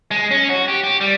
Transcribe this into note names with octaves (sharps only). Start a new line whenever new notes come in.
G#3
C#4
F#4
G4
G4
G3